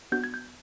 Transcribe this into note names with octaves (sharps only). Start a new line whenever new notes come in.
B3 D4 F#4 G6
G#6
G6